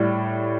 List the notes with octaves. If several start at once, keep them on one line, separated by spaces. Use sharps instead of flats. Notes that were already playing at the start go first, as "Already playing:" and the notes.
Already playing: A2 G3 D5